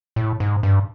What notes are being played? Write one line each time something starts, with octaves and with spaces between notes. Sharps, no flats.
A2
G#2
G2